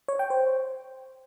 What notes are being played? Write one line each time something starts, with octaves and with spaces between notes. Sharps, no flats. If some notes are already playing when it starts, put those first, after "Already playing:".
C#5
G5
C5